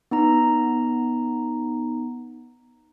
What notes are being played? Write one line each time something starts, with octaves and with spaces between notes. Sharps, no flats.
B3 D#4 A#5